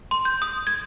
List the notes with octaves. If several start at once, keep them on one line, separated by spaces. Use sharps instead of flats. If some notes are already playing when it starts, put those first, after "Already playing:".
C6
G6
D#6
G#6